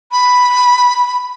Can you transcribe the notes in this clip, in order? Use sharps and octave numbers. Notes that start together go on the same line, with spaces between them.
B5